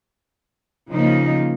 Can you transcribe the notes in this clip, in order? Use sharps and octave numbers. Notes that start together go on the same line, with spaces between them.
C#3 F3 A#3 D#4